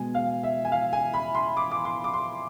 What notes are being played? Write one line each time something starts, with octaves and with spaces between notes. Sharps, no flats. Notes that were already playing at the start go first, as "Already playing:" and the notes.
Already playing: B2 G#3 G#5
F5
E5
G#5
F5
G#5
B5
C6
D6
D6
C6
D6
C6